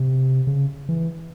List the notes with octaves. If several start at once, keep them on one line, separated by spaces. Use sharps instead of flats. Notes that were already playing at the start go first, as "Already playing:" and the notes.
Already playing: C3
C#3
E3